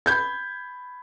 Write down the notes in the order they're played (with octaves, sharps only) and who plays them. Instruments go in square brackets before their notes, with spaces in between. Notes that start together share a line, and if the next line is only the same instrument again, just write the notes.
[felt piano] B5 G6 G#6